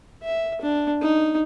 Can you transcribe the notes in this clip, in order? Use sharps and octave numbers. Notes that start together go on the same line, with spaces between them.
E5
D4
D#4